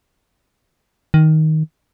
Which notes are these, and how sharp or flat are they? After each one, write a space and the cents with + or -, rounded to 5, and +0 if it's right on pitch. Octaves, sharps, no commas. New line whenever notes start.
D#3 +10